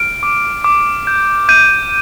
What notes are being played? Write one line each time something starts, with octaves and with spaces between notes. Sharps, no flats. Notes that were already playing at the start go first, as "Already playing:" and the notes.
Already playing: F6 D7
D6
D6
G6
G6 D#7